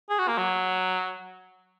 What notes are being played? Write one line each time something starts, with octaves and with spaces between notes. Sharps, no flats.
G#4
F#4
A#3
F#3